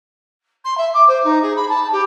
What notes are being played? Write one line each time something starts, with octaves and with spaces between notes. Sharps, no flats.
C6
E5
D6
C5
D#4
G#4
B5
A5
G4